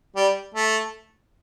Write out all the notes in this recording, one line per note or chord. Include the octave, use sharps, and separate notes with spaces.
G3
A3